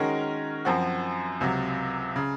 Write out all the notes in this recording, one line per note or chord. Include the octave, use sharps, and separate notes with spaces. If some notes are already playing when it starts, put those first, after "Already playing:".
Already playing: D#3 G#3 C#4 F#4 A#4
F#2 F3 C4 F#4
C#2 C3 F#3
C#3